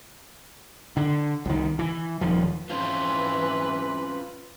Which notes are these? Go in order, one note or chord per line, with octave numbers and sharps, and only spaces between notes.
D3
C2 D#3
E3
D#1 D#2 F3
E3 C4 C#4 F4 B4 C6